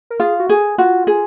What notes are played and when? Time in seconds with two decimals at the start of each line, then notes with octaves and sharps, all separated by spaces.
0.10 A#4
0.20 F4 G#4
0.40 F#4
0.49 G#4
0.78 F4 F#4
1.07 G#4